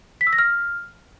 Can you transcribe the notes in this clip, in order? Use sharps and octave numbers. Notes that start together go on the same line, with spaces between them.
B6
E6
A#6
F6